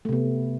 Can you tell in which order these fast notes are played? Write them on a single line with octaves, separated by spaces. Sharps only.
A3 C3 B3